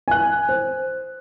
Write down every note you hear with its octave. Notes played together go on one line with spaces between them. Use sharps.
G#5 F#6
C5